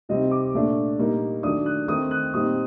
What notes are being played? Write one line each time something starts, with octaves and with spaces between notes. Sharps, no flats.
C3 G3 C4 D#4 D#5
D6
A#2 A3 D4
A#2 G3 A#3 D#4
D#3 F#3 A3 D4 D#6
F#6
D#3 A3 C4 D#4 D#6
F#6
A#2 G3 C4 D#4 D#6